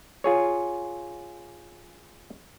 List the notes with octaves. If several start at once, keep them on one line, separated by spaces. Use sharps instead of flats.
F4 G#4 C#5